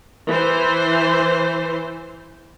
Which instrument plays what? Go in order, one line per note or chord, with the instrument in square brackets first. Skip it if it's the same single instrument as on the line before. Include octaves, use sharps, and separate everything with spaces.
[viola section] E3 C5